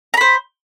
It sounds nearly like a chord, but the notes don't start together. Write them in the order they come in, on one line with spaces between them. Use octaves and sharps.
A#5 B5 C5